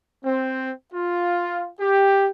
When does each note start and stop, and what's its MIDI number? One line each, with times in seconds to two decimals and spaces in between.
0.24 0.71 60
0.93 1.67 65
1.79 2.28 67